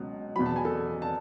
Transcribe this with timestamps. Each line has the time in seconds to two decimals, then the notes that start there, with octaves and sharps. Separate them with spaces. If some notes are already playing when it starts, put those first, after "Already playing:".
Already playing: C#2 B2 F#3
0.36 E2 B2 F#3 B5
0.46 A5
0.56 G#5
0.65 A4 A5
1.02 A5